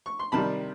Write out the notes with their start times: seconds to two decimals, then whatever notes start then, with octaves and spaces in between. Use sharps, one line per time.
0.06 C#6
0.19 C6
0.32 C3 D#3 G3 A5 B5